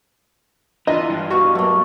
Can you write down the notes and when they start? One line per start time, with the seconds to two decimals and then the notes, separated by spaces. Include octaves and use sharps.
0.87 E3 D4 F4 D#5
1.10 G2
1.30 B2 F#4 G4 F5 C#6
1.55 F#3 A3 A#3